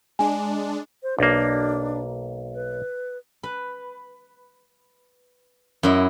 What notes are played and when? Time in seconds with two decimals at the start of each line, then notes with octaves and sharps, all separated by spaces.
0.19 G#3 D4 G#5
1.03 C5
1.18 B1 A#3 D4
2.54 B4
3.43 B4
5.83 F#2 E4 D#5